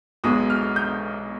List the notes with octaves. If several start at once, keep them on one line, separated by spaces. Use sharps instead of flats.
B1 B2 G#3 D#6
F6
G6